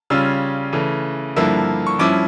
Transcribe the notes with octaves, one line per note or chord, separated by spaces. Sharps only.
C#3 G3 C#4 F4 E6
C#3 E3 A3
G2 D3 F3 A#3 E4 E6
C#6
G2 F3 C#4 E4 D6